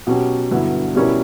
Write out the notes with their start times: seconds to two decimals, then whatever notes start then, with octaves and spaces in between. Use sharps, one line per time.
0.07 B2 F#3 C#4 G4
0.51 G2 D3 F#3 B3 E4
0.95 B2 G3 C#4 E4 A#4